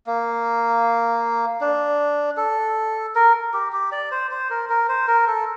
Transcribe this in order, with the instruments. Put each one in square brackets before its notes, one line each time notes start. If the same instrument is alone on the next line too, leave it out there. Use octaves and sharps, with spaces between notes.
[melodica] A#3
D4
A4
A#4
G4
G4
D5
C5
C5
A#4
A#4
C5
A#4
A4